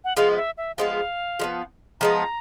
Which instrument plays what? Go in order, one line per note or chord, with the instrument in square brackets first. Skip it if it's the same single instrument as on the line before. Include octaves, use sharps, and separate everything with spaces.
[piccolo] F#5
[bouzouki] F3 G#3 B3 [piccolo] F5
[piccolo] D#5
E5
E5
[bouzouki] F3 G#3 B3 [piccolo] F5
[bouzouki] F3 G#3 B3
[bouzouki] F3 G#3 B3 [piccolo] A#5